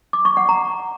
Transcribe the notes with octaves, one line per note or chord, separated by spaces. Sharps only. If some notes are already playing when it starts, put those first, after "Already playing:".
D6
C#6
F#5
A#5